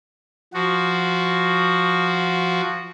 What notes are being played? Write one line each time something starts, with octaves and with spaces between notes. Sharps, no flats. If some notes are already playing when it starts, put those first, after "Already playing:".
F3 F#4